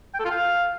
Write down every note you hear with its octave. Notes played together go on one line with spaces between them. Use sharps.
G5
A4
F4
F5